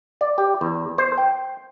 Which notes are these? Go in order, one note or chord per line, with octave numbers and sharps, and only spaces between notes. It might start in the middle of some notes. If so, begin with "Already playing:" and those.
D5
G4
E2
C5
G5